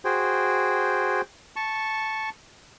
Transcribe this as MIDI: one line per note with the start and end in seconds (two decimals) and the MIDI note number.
0.05 1.21 66
0.05 1.21 68
0.05 1.21 72
0.05 1.21 79
1.56 2.30 81
1.56 2.30 85